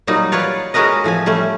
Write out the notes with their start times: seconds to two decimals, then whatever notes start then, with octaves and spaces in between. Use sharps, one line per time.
0.07 A#2 F#3 G3 D#4
0.32 F4 B4 C#5 D5
0.74 G#3 C#4 F#4 A#4 B4 D#5
1.04 A2 F3 C4 G#5
1.26 G3 A3 C#4